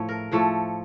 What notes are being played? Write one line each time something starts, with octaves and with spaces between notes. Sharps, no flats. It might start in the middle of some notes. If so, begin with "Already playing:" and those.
Already playing: A2 F3 A3 C#5
A#4
A2 F3 A3 C#5